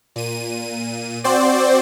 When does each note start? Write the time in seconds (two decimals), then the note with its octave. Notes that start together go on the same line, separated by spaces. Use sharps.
0.16 A#2 D#7
1.24 C4 F#4 C5 D5